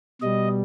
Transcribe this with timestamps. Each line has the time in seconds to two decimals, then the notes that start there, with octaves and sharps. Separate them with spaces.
0.22 B2 G3 D#5